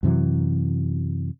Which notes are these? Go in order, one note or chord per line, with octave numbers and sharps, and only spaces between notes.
F#2 C3 E3 F#3